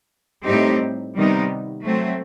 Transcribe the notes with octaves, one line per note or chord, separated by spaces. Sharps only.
A2 G3 C4 D#4 G4
C3 D#3 G3 B3 D#4
F#3 A3 C4